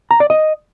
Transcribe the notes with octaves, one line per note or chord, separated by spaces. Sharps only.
A#5
D5
D#5